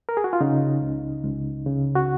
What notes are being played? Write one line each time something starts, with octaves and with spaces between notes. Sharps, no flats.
A#4
G#4
F#4
F4
C#3 D#4
C#2
C#2
C#3
F#4